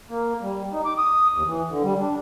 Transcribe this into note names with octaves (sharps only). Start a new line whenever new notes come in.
A#3
G3
D#4
D6
D#6
D#2
E3
D3
G3
D4